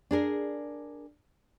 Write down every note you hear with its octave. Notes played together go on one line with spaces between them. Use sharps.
D4 G#4 A#4